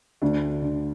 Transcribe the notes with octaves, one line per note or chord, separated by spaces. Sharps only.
D2 D4
D3